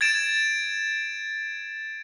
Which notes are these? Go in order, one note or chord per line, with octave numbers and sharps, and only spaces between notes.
G#6 A6 D7 E7